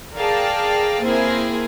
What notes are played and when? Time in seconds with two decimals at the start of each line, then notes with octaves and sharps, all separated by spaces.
0.15 G#4 A#4 D5 F5 G5 A5
1.04 A#3 C4 E4 G#4 A#4 C5